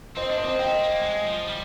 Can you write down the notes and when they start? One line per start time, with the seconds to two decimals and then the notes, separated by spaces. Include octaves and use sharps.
0.16 C4 C5 D#5
0.31 D4
0.38 C5 D#5
0.45 C4
0.59 C4 D#5 G5
0.81 A#3
1.02 G#3
1.24 F3
1.46 G3